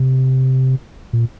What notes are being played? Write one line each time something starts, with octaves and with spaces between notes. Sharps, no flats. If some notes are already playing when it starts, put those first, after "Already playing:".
Already playing: C3
A#2